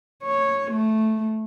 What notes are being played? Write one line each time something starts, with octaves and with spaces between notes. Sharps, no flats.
C#5
A3